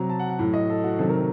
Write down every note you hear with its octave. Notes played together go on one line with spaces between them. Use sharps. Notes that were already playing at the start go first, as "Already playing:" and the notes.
Already playing: C3 F#3 A#5
A5
F#5
F#5
A2 F#3
D#5
A4
F#4
C3 D#3 F#3 A4
A#4